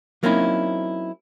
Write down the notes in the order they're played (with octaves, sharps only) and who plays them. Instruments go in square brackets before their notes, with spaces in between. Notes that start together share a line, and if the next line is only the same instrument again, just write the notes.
[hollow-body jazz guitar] F#3 A#3 C4 C#4 D#4 E4